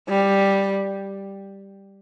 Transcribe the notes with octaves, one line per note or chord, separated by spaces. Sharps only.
G3